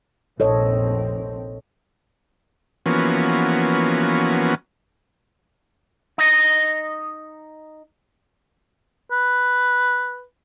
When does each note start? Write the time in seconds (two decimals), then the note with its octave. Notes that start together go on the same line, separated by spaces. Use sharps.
0.40 F1 A#1 C4 A4 C#5 D#5
2.86 E3 F3 A#3 B3 C#4 F#4
6.18 D#4 D#5
9.11 B4